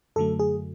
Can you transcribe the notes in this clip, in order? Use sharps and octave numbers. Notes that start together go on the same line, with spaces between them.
F#2 D3 F#3 A3 A4
G#4